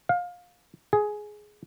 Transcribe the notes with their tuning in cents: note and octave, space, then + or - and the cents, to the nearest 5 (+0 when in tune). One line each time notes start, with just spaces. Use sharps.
F5 +25
G#4 +10